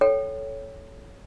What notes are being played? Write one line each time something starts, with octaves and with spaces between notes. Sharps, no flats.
A4 C#5 G5